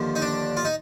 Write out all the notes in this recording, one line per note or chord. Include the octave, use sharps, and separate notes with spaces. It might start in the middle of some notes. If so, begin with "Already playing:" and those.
Already playing: D#2 D3 F3
D#4
D4
F4
D#4